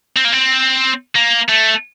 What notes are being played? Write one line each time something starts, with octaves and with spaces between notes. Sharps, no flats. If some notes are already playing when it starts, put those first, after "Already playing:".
C4
A#3
C4
A#3
A3